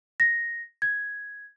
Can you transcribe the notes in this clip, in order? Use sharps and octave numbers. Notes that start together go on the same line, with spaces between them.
A#6
G#6